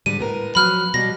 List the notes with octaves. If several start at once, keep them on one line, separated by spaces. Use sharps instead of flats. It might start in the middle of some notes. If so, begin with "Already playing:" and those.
G#2 D3 G3 D#7
A2 B3 A#4
F3 F#3 B3 B5 F6 F#6
B2 F#3 G3 A#6